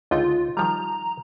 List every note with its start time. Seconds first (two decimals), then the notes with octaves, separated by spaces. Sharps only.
0.11 C#2 D3 D#4 F4
0.57 D#3 F3 G3 A#5